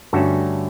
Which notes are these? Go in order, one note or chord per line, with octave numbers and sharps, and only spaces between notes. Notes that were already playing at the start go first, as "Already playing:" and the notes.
G2 D3 A3 C#4 F#4 A4